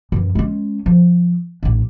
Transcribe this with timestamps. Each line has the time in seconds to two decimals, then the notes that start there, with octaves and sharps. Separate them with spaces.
0.12 F#2 E3
0.35 G#3 C#4
0.86 F3
1.63 A1 D4